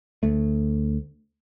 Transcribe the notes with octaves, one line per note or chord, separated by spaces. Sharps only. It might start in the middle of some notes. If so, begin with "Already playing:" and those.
D2 A3